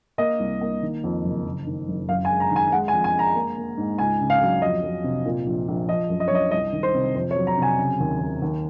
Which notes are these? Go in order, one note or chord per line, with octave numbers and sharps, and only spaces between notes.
A#3 D#5
C2
A#3
D#3
F2
F#1
F#1
D#3
F#1
F#2 F5
G#5
G#3
A#5
D#3 G#5
G#3 F#5
G#5
F2
G#5
G#3
A#5
A#3
A#3
G#2
C#2 G#5
C#3
F5
F#3
F2 D#5
F#3
C3
A#2
A#1
A#1
F3 D#5
F#2
D#5
C#5
F#2 D#5
C2 D#5
D#3
C5
C3
F2 C5
C#5
F#3
A#5
C3 G#5
C#3
D#2
D#2
D#2